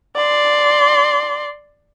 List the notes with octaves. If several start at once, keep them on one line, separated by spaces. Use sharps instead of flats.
D5 C6